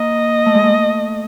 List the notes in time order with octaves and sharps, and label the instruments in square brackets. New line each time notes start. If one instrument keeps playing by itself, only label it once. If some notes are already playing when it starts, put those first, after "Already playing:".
Already playing: [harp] A#3 [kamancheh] D#5
[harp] A3
G#3
A3